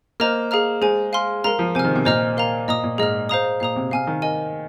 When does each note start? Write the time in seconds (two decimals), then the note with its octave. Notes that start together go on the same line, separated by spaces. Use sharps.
0.20 A#3 C5 D#5 A#5 F6
0.51 G#4 F5 A#5 F6
0.82 G#3 G#4 C5 G#5
1.13 F5 G#5 C6 F6
1.44 G#3 A#4 F5 A#5 F6
1.59 F3
1.75 C3 C5 G#5 F6
1.85 D#3
1.96 C3
2.05 A#2 C5 D#5 A#5 F6
2.37 A#4 F5 A#5
2.68 A#2 D#5 A#5 D#6
2.83 A#2
2.98 G#2 G#4 D#5 A#5 F6
3.29 C5 F5 A#5 D#6
3.60 A#2 F5 A#5 D#6
3.76 C3
3.91 C3 F5 G#5 F6
4.07 D#3
4.22 A#4 D#5 G#5